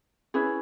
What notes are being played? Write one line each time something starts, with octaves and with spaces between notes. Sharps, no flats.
C#4 E4 G#4 B4